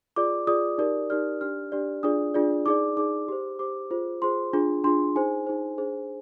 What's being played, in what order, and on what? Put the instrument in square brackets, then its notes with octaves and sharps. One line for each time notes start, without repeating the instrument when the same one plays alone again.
[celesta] F4 G#4 D5 D6
F4 G#4 D5 D#6
D#4 G4 A#4 D5
D#4 G4 A#4 D5 F6
D4 G4 D5 F6
D4 G4 D5
D4 F4 G#4 D5 D#6
D4 F4 G#4 D5
D#4 G#4 D5 D6
D#4 G#4 D5 D6
G4 C5
G4 C5 D6
F4 G#4 C5
F4 G#4 C5 C6
D4 F4 G#4
D4 F4 G#4 C6
D#4 G#4 C5 G#5
D#4 G#4 C5
D4 G#4 C5